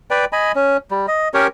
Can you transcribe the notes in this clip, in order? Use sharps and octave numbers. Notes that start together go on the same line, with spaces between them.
B4 D5 G5
D#5 G#5 B5
C#4
G3
D#5
C#4 G4 A#4 C#5